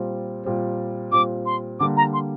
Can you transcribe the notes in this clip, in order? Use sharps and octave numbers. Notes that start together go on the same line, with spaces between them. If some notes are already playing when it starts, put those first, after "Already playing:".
Already playing: A#2 G3 C4
A#2 G3 C4
A#2 G3 C4 D6
C6
D3 G3 A#3 D6
A#5
C6